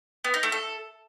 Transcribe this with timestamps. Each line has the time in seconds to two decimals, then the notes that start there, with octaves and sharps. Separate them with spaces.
0.24 B3
0.34 D#4
0.43 A3
0.52 A4